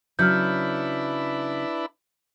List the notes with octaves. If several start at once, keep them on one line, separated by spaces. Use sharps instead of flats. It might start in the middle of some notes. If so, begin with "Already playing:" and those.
C#3 F#3 D4 E4 B4 F6 G6